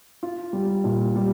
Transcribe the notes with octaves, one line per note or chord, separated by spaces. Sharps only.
F4
G3
A#2
G3